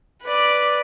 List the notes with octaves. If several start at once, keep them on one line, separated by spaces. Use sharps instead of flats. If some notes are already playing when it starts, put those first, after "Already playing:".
B4 D5